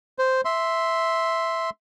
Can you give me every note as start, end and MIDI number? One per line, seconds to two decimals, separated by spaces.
0.19 0.41 72
0.45 1.70 76
0.45 1.70 84